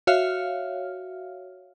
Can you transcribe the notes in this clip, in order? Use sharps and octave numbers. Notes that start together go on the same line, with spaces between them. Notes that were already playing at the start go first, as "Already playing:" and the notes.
F#4 C#5 E5 F5 F6